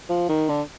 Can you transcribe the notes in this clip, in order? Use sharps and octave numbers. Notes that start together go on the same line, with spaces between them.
F3
D#3
D3